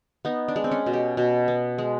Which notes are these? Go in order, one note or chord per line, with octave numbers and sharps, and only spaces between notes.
B3 D#4
D4
G#3
C4
C#4
B2
G4
B2
B3
G#3